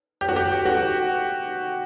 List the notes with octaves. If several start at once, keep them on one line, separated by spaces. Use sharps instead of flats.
G4
F#4
G4
F#4